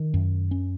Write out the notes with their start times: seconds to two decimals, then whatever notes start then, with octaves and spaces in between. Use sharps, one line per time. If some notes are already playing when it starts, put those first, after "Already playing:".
Already playing: D#3
0.14 F#2
0.51 C#4